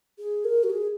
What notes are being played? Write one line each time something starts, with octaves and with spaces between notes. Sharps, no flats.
G#4
A#4
F#4
G#4